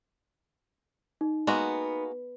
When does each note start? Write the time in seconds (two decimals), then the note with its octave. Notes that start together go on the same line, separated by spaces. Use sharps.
1.21 D#4
1.47 G#3 A#3 B3 F#4